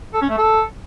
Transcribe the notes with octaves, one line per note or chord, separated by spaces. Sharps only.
A4
C#4
A3
A4